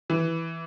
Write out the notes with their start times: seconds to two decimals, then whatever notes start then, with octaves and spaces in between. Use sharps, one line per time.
0.10 E3